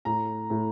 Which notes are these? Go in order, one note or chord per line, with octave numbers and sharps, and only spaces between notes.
A2 A#5
A2